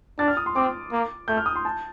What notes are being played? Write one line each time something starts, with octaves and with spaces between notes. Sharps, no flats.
D4 A6
F6
D#6
C6
C4 D6
A#3
A3 G6
F6
D#6
C6
A5